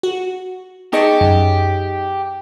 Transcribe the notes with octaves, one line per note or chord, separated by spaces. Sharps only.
F#4
D#4 G4 G#4 D#5 A5 C#6 D6
F#2